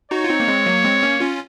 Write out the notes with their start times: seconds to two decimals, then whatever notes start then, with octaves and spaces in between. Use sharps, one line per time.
0.11 D#4 F#4 C#5
0.24 F4
0.29 C4 D#4
0.40 A#3
0.48 G#3 C4
0.66 F#3 A#3
0.84 G#3 C4
1.03 A#3 C#4
1.20 C#4 F4